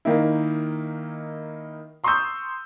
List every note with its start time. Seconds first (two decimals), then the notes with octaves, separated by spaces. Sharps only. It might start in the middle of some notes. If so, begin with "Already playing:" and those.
0.05 D#3 A#3 D#4 E4
2.04 A#5 C6 C#6 D#6 E6 G6